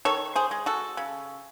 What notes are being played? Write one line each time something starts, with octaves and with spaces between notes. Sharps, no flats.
D#3 A4 C#5
G#4 C5
G#3
F#4 A4
C#3